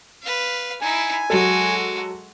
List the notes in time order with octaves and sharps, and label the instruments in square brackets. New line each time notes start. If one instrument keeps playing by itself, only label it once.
[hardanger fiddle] B4 F5
[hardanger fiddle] D#4 E4 [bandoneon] G#5
[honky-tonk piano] F#3 A4 [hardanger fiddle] G#3 F#4